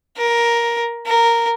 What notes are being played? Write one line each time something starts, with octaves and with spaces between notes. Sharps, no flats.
A#4
A#4